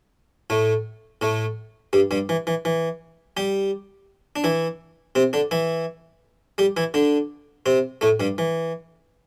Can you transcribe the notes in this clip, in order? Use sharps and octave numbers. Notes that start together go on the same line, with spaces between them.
A2 A3
A2 A3
G2 G3
G2 G3
E3
E3
E3
G3 G4
D4
E3 E4
C3 C4
D3 D4
E3 E4
G3 G4
E3 E4
D3 D4
C3 C4
A2 A3
G2 G3
E3